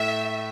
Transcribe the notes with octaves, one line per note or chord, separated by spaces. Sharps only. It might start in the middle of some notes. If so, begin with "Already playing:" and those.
Already playing: A2 A3 E5